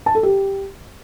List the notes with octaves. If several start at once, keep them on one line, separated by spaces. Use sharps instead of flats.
A5
A4
G4